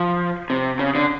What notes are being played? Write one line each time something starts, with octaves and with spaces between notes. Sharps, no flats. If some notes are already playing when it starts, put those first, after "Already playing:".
Already playing: F3
C3
C#3
D3